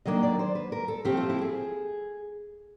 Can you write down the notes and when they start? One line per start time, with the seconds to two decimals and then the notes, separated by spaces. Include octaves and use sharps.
0.05 D#3 F#3 A#3 D4 D#5
0.23 D5
0.39 C5
0.55 B4
0.72 A#4
0.88 A4
1.05 F3 A3 C4 G4
1.17 F4
1.30 E4
1.41 G#4